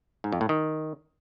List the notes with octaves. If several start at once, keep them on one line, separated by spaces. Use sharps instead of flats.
G#2
F2
A2
D#3